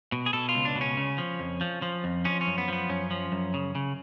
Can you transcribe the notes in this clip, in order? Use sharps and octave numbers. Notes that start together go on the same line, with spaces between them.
B2
G#4
B2 A4
F4
C#2
D4
B2
C#4
C#3
F3
F2
F3
F3
F2
F3 C#4
C#4
F#2
B3
F3 B3
F#2 C#4
F3
F#2
C#3
C#3